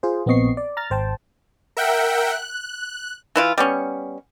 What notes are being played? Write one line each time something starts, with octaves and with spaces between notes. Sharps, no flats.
F4 G#4 C5
A#1 B3 C4 D#5 C#6 C7
D5
A#5 F6 A6
G#1 C5 G5 A5
A#4 E5 F#5 G5
F#6
E3 E4 F4
G3 B3 C#4